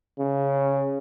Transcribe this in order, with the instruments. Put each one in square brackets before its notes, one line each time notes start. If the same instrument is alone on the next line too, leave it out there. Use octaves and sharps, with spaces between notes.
[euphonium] C#3